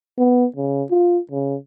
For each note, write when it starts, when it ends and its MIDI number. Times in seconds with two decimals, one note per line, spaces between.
0.17 0.45 59
0.56 0.83 49
0.90 1.19 65
1.31 1.56 49